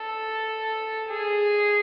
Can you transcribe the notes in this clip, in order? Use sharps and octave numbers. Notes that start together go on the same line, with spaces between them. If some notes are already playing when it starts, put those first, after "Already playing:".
Already playing: A4
G#4